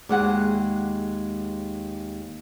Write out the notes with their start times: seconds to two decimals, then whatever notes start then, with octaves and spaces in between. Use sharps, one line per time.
0.09 D#2 G#3 F#5